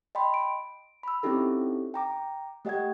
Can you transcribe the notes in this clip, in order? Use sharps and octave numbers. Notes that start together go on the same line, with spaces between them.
D#5 G5 B5 C6
D7
B5 E6
C4 C#4 D#4 E4 G4 A4
G5 A#5 D6
A3 G4 D#5 F#5 G5 G#6